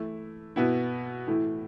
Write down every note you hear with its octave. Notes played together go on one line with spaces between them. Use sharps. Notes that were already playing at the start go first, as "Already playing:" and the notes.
Already playing: E3 A3 E4
B2 B3 E4
A2 E3 A3 E4